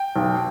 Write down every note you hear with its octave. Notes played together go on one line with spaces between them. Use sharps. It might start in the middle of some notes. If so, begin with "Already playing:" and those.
Already playing: G5
B1